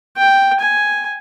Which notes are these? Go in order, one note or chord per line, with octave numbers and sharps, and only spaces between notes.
G5
G#5